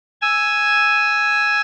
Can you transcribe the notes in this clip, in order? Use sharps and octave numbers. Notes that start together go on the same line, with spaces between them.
G#5 E6